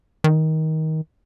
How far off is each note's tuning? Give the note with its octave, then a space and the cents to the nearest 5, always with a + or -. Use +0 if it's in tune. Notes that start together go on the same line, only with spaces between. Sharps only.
D#3 +20